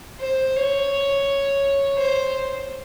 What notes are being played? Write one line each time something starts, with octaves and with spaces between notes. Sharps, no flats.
C5
C#5
C5